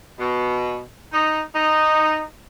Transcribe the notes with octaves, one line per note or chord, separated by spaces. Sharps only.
B2
D#4
D#4